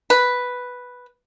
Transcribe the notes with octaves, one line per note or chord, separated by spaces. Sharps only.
B4